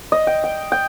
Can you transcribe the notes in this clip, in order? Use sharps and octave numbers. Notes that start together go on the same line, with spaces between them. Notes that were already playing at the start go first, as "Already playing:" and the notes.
D#5
G5
G5
G5